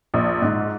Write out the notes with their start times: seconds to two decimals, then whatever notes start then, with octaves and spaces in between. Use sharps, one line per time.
0.14 A#1
0.42 G#2